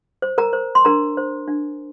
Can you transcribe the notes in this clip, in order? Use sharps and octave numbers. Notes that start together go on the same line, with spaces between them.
C5
A#4 A#5
C5
C6
D4 A#4 A#5
C5
D4